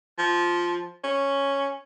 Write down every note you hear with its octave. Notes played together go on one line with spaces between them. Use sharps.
F3
C#4